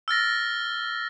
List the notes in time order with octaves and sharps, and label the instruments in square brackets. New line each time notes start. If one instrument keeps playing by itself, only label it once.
[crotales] E6 F6 A6 A#6